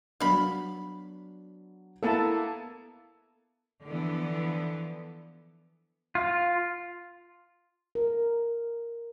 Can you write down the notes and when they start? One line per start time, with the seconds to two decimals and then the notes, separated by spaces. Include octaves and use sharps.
0.20 F#3 B3 D4 F5 B5
2.03 A#3 B3 E4 A4 A5 A#5
3.84 D3 E3 F3 B3
6.15 F4
7.95 A#4